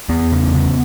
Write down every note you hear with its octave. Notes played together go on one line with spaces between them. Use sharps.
E2 B3
C#3
C#3